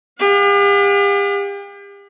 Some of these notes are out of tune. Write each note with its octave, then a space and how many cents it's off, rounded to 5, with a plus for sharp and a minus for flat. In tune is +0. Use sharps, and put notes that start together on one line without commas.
G4 +40 F#5 -40